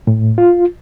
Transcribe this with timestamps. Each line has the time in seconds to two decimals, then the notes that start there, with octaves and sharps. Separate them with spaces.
0.07 A2
0.38 F4